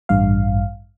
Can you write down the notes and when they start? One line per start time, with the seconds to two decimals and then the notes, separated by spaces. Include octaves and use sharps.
0.09 A1 G2 F5